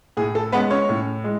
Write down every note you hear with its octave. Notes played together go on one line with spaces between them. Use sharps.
A2 G#4
A4
G#3 B3 C#4 B4
C#4 C#5
A2
G#3